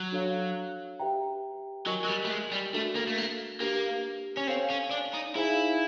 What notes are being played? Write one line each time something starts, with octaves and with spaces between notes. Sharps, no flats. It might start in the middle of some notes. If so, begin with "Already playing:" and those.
Already playing: F#3
D4 F#4 A4 C#5 F5
G4 B4 E5 G5 A#5
F#3 A#4 D#5 G#5 C#6
F#3
G3
A3
G#3
G3
A3 D4 F#4 A4
A#3
A3
A#3
A#3 D4 G4 B4
C#4
C4 A4 C#5 F5 G#5
C#4
D4
D#4
D#4 E4 G#4 C5 F5 G#5